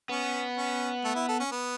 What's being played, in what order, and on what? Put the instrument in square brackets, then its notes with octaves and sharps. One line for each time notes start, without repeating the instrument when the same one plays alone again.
[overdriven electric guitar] B3 [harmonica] C#4
[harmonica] C#4
A3
E4
A4
C#4
B3